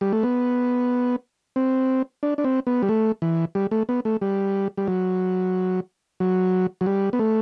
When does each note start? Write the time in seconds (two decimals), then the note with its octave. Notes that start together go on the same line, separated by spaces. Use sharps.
0.01 G3
0.12 A3
0.23 B3
1.56 C4
2.23 D4
2.38 D4
2.44 C4
2.67 B3
2.83 G3
2.89 A3
3.22 E3
3.55 G3
3.71 A3
3.89 B3
4.05 A3
4.21 G3
4.77 G3
4.88 F#3
6.20 F#3
6.81 F#3
6.86 G3
7.13 B3
7.19 A3